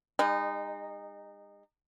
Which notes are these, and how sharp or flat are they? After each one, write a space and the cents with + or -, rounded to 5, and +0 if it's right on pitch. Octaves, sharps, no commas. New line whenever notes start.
G#3 -45 D#4 -20